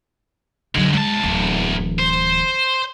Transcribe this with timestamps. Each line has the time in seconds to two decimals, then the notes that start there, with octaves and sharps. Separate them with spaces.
0.75 F#2 D3 F#3 G#3
0.93 E2 G#3 A5
1.23 D1 E3
1.99 C5